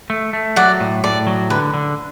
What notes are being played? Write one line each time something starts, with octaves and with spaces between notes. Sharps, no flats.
A3
A3
F#3 D5 F#5
A2
A2 D5
F#3
D3 B4
D3